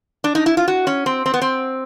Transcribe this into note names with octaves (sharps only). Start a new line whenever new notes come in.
D4
D#4
E4
F4
F#4
C#4
C4
C4
B3
C4